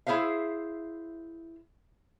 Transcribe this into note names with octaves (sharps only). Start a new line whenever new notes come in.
E4 G#4 C5 E5 F5